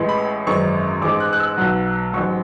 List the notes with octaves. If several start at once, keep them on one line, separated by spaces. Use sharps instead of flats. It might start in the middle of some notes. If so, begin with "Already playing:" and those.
Already playing: A1 A2 E3 G#3
B5
G#1 F#2 E3 G#3 C#6
A1 G#2 G#3 D6
F#6
F#6
E6
B1 B2 F#3
A1 G#2 F#3 C#6